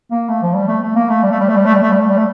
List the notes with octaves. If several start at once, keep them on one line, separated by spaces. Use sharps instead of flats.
A#3
A3
F3
G3
A3
A3
A#3
A3
G3
A3
G3
A3
G3
A3
G3
A3
G3
A3
G3
A3